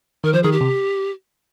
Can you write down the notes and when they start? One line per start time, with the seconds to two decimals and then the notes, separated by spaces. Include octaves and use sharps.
0.24 D#3 A#4
0.33 F3 C5
0.43 D#3 G#4
0.52 G4
0.61 C3